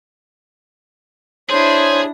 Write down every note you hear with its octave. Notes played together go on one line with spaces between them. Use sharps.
D4 E4 G#4 C5 C#5